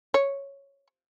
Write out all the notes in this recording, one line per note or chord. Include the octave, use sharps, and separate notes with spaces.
C#5